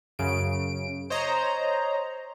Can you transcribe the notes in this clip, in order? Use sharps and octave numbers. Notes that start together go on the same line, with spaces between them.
F#2 C#3 D7
C5 C#5 D#5 A#5